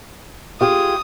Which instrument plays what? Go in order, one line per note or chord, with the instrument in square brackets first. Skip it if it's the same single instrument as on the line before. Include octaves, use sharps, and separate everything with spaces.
[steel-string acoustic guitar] F4 G4 G#4 [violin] D#6